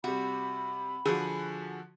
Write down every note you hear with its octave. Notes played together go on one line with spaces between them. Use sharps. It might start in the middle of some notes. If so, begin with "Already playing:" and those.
C3 G3 F#4 B5
D3 F3 F#4 G#4